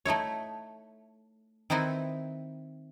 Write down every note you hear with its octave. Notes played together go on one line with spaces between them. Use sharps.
A3 D#4 E4 C#5
D#3 C4 D#4 E4 B4